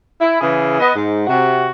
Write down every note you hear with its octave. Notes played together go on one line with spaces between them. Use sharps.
E4
C#3 E3 E4 G#4
B3 D#5
G#2
C3 F#4